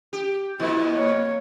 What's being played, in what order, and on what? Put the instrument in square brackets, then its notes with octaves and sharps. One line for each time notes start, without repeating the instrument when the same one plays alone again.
[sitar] G4
[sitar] F2 A#2 [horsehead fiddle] E4
[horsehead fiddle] A#3 C#5